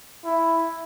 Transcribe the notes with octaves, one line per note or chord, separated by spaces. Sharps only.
E4